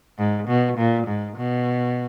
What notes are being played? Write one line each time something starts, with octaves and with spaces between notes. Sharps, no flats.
G#2
B2
A#2
G#2
B2